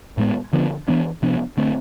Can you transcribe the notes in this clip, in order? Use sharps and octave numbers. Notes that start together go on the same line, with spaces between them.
A2 G#3 B3
D3 F3 B3 D4
E3 B3 D4
C3 F3 B3 D4
D3 A3 C4